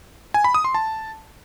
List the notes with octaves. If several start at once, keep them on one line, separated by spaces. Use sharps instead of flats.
G#5
B5
D#6
C6
A5